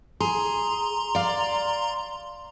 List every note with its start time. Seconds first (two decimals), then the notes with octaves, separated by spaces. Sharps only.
0.20 G#4 A#5 C6
1.15 D5 F5